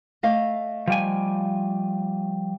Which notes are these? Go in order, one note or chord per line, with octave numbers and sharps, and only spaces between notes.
A3 D#5 F5
F3 G3 G#5